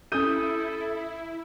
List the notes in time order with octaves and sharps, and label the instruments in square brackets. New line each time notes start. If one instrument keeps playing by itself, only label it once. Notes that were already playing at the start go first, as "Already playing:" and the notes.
[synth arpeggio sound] C#4 G4 [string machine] E4 [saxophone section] A4 [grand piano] D#6 G6 D#7